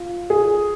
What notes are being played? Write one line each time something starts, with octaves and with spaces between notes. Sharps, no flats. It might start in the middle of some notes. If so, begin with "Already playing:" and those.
Already playing: F4
G#4